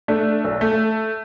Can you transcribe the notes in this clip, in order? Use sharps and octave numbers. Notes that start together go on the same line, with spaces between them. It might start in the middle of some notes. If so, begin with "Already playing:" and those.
A3 D4
B1
A3